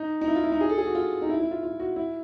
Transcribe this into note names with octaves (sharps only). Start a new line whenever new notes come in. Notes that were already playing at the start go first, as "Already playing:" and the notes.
Already playing: D#4
D#4
E4
F4
E4
D#4
G#4
A4
G#4
F#4
F4
D#4
E4
E4
F4
F4
F#4
E4